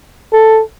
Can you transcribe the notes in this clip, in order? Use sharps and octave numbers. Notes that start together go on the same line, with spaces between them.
A4